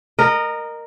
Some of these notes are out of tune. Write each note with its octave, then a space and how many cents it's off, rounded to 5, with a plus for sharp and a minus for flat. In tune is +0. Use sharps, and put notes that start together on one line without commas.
A#4 +0 D#5 -25